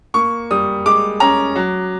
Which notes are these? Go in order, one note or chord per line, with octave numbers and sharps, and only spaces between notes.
A#3 C#6
G3 D#6
G#3 D6
C#4 A#5
F#3